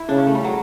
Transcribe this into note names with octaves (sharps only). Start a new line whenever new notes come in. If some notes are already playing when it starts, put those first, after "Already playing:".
Already playing: E4
C#3 D4
C#4
A3
G3
F#3